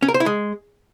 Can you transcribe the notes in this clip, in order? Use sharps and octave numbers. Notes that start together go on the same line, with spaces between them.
C#4
A#4
C5
E4
G#3